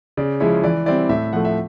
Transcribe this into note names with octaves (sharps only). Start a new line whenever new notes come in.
C#3 D5
F3 G#3 C#4 E4 C#5
E3 D5
G3 C4 E4 D5
A2 E5
F3 A3 F#5
E5